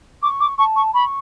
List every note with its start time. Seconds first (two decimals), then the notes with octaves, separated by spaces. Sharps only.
0.22 C#6 D6
0.40 D6
0.58 A5 C#6
0.76 C#6
0.94 B5 C#6